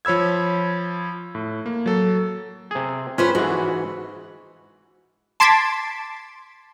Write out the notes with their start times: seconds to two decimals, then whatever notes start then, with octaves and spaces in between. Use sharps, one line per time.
0.05 F3 C#5 B5 E6 G#6
1.35 A2
1.66 A#3
1.86 F#3 A4
2.71 C3 G#4
3.18 C#4 F4 B4 C5
3.35 G#2 E3 F#4
5.40 A5 C6 D6 G#6 A6 B6